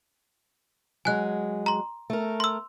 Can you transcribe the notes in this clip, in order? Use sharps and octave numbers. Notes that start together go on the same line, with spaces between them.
F#3 G#3 G#5 F#6
A#5 C6
A3 A#4
C6 E6